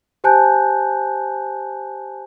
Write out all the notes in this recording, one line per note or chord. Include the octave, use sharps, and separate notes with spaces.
G4 C5 G#5 A5 F#6 G6